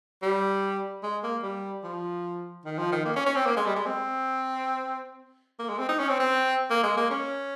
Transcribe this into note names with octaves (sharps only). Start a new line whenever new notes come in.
G3
G#3
A#3
G3
F3
D#3
F3
D#3
A#3
C#4
C#4
C4
A#3
G#3
G3
G#3
C4
A#3
G#3
C4
D#4
C#4
C4
C4
A#3
G#3
A#3
C#4